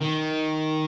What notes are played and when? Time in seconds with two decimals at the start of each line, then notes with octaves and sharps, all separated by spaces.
0.01 D#3